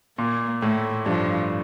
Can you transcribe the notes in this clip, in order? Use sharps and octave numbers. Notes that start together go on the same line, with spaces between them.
A#2 A#3
A2 A3
G2 F3